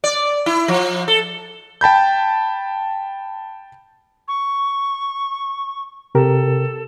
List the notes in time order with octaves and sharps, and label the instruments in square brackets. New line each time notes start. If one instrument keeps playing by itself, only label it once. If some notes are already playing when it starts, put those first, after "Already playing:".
[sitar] D5
E4
F3
A4
[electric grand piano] G5 A5 B5 G6
[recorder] C#6
[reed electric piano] C3 G4 A#4 [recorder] A4